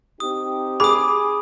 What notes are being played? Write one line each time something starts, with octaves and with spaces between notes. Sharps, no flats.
C4 D#4 G4 D#6
G#4 B5 D6 D#6